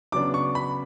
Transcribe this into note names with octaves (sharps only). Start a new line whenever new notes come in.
C#3 F#3 B3 D4 D6
C#6
B5